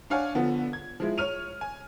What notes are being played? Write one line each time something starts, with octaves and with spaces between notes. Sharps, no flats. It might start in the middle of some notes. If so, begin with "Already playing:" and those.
D4 C#5 F5 F#5 G#5
D3 F3 B3
G#6
F3 G#3 E4
C#5 F6 D#7 F7
G#5